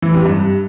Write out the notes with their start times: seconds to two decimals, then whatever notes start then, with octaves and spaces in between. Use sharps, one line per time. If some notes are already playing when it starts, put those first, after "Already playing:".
0.02 E3
0.14 C3
0.25 G2